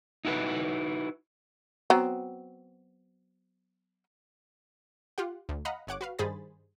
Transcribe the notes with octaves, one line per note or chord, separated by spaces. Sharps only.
D#4 E4 F#4 A4 B4
F#3 B3 C4
F4 G4 F#5
D2
D#5 F5 F#5 A#5 B5
G1 C#5 F#5 D6
F#4 B4 F5
G2 D#3 G#4 C5 B5 A6